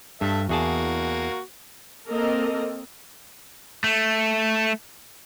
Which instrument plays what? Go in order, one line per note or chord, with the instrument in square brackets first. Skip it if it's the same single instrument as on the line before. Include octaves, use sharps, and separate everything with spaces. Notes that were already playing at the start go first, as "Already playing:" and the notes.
[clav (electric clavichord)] G2 [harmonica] A4 E5
[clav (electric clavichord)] E2 G#4 A5 [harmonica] A#3 F#4
[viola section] A#3 C4 A4 A#4 D#5
[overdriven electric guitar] A3